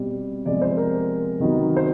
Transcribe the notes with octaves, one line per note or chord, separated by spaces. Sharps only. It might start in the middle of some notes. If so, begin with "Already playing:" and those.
Already playing: B2 G3 C4
C3 F3 G#3 B3 D5
C5
A#4
C3 D#3 F#3 B3
C5